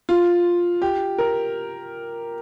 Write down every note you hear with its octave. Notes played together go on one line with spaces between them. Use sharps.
F4
G4
A#4